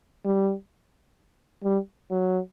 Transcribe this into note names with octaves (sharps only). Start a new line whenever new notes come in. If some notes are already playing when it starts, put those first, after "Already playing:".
G3
G3
F#3